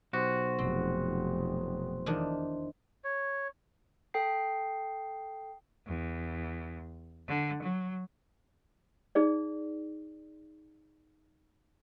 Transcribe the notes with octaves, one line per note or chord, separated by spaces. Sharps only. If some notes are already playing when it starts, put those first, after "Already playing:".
B1 F#4 G4 C5 C6
F1 C4
E2 D#3 D4
C#5
A4 G5 C7
E2
D3
F#3
D#4 G#4 D5